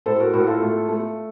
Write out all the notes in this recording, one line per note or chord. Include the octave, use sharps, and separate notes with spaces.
A2 A4 C5
F#4 A#4
A2 F#4 A#4
F4 A4
A3
A3